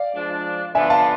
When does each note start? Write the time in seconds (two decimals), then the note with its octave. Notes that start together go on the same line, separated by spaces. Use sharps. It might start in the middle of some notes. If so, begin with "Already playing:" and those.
Already playing: D5 F5
0.14 F3 G#3 D4
0.75 D3 F3 B3 D4 F4 E5 G#5
0.90 F5 A5